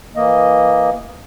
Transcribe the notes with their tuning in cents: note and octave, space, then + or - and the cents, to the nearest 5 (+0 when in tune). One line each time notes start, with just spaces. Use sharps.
E3 +0 A#3 +0 D#5 +0